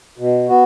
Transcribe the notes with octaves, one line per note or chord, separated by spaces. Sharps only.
B2
B3 F#4